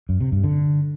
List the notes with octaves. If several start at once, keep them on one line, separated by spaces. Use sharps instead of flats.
F#2
C3
G2
D3